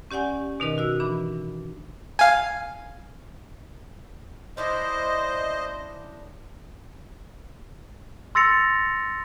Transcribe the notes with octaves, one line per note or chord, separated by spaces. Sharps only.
C#4 G4 D5 F#5 G#5
B2 D#3 D#4 A#4 B4 D#5
F#4 E6
E3 D4 B5
F5 G#5
C#4 D4 E4 C5 D#5
C6 E6 A6 A#6 C#7 F7